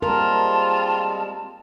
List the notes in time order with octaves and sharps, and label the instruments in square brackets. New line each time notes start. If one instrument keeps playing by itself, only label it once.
[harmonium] G3 G#3 C4 [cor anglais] F4 [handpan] A#4 [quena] A5